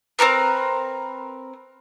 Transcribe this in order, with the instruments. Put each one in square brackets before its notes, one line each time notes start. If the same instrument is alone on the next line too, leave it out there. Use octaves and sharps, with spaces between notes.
[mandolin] C4 D#4 A#4 B4